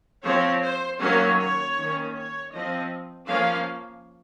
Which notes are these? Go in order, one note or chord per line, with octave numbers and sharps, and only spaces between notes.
F3 C4 C#5
C5
D#3 F#3 A#3 C#4 C#5
C#5
D#3 A#3 C#4
C#5
F3 C4 D#5
F3 A#3 C#4 F5